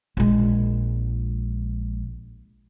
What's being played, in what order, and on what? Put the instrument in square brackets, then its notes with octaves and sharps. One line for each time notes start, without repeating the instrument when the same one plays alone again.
[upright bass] A#1 G#3